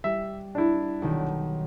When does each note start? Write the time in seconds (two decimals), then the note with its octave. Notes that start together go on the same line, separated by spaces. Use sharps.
0.04 G3 E5
0.55 D4 E4
1.02 B1 D#3